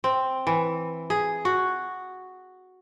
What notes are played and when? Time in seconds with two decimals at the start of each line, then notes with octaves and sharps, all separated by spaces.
0.04 C4
0.47 E3
1.10 G#4
1.45 F#4